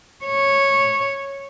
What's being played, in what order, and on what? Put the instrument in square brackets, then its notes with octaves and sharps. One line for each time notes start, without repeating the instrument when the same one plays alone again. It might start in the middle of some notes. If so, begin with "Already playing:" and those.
[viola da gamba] C#5